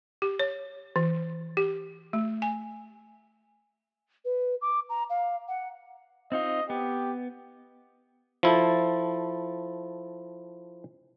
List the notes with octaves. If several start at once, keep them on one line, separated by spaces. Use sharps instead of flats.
G4
C#5
E3
G4
A3
G#5
B4
D6
A#5
F5
F#5
C4 D#4 F4 D#5
B3 G4
F3 E4 A4